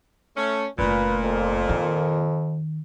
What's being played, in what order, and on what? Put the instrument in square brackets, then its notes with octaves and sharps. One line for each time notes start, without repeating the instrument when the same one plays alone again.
[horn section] A3 C#4
[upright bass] F#1 A3 [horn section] A#2 [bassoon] B4
[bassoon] F2
[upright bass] D#3